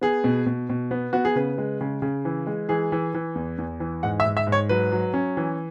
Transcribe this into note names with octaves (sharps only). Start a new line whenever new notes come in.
B3 G#4
B2
B2
B2
B3
B3 F#4
G#4
C#3 B4
G#3
C#3
C#3
E3
G#3
E3 G#4
E3
E3
E2
E2
E3
G#2 F#5
E5
G#2
E5
G#2
C#5
F#3 B4
F#3
C#4
E3